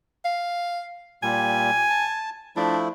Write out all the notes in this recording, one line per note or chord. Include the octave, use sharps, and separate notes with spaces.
F5
A#2 G3 G#5
A5
F3 A3 D4 E4